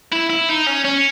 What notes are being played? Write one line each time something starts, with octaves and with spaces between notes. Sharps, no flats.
E4
E4
D#4
C#4
C#4